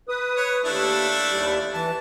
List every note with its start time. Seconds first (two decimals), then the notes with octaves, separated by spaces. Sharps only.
0.09 B4 D#6
0.37 C#5
0.65 D#2 A3 D4 E4
1.30 D#2 G3
1.74 E3 A5